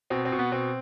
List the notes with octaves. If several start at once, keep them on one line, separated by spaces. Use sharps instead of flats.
B2 C4
C4
B2
B3
B2 C4